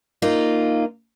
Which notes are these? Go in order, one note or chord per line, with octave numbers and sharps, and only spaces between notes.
A#3 D#4 F4